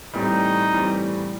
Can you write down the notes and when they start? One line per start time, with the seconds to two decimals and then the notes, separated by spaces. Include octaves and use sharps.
0.14 A2 E3 G3 C4 D#4
0.73 A2 E3 G3 C4